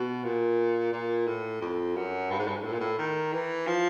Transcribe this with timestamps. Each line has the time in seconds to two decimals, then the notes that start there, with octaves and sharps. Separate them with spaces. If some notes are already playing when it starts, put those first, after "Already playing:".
Already playing: B2
0.24 A#2
0.92 A#2
1.27 A2
1.61 F2
1.96 F#2
2.31 G2
2.39 G#2
2.48 G2
2.56 G#2
2.64 A2
2.73 A#2
2.80 A2
2.98 D#3
3.33 E3
3.67 F3